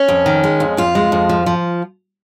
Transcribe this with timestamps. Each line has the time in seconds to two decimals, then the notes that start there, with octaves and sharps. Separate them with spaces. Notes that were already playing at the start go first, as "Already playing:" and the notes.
Already playing: C#4
0.08 F2
0.26 D#3
0.44 G#3
0.60 F2
0.77 F2 F4
0.95 G#3
1.12 F2
1.29 F3
1.46 F3